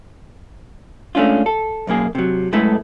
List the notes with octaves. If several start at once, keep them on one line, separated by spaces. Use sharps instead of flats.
G#3 A3 C#4 D4 F4
A4
B1 F#2 A#3 G#4
C3 F#3
F#2 G#3 A3 B3 E4 A4